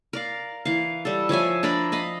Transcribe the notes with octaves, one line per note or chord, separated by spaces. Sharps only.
A#4 D5 F5
E3 F5
G3 A4
F3 C#5 E5 G#5
D4 A#4 D5 B5
D#5 F5 B5